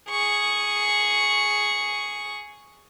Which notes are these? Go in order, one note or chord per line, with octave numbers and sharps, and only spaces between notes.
G#4 C#6